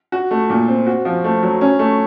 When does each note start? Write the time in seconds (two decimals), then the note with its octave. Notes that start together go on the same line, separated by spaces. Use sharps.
0.12 F#4
0.31 A3
0.50 A#2
0.68 C4
0.87 F#4
1.05 F3
1.24 A3
1.43 F#3
1.61 C#4
1.79 A3